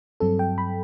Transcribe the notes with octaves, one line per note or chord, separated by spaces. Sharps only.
G2 F#3 C4 A4
G5
B5